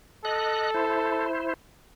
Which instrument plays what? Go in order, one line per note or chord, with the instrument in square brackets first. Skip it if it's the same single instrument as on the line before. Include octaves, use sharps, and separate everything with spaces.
[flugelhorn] A4 [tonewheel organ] D#5 F#6
[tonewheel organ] E4 C5